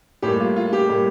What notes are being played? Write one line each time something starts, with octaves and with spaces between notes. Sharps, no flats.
A2 G3 A#3 G4
F4
F4
G4
A2 G3 A#3